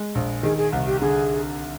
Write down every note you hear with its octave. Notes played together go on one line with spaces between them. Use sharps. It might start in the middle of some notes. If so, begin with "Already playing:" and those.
Already playing: G#3
A#1
D#3 G#4
G#4
C2
G4
D3 G#4